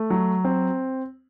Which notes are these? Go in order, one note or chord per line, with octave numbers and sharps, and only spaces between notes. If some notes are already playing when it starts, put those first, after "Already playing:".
Already playing: A3
F#3
C4